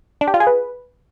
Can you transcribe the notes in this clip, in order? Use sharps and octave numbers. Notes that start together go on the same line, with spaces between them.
D4
G4
F4
G#4
B4